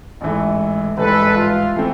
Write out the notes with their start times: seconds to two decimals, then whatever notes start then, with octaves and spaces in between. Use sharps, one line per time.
0.21 A1 G#2 E3 A3
0.97 A1 G#2 E3 G3 A4 B4
1.36 F4
1.76 E3 A3 C4